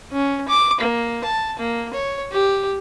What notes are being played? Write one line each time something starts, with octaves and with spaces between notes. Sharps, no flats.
C#4
D6
A#3
A5
A#3
C#5
G4